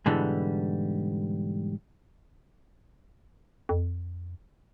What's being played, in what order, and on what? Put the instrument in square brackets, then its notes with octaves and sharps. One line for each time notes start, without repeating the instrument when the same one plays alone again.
[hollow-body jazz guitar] G#2 B2 D3 E3 G3
[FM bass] F2